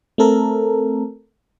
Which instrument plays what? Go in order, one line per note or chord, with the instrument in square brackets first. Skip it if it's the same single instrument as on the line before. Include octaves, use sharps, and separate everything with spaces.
[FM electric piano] A3 C4 A4 A#4